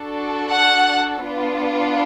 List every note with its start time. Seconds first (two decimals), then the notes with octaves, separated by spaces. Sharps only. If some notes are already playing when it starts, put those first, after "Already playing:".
Already playing: D4 F#4 A4
0.51 F#5
1.25 B3 D4 F4